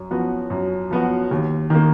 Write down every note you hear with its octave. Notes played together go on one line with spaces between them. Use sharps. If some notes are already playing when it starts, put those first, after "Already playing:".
Already playing: F#2
F3 B3 F#4
F#2
F3 B3 F#4
D#2
D#3 A#3